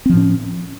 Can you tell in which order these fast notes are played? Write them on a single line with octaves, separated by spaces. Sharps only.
C4 F3 A2 C#4